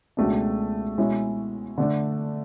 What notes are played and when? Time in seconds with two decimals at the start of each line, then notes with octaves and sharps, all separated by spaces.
0.17 C#2 B2 A3 D4
0.98 B2 G#3 C#4 E4
1.78 D3 A3 D4